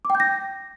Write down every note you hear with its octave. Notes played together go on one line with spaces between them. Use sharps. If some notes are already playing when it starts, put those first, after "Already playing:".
D6
G5
G6
A#6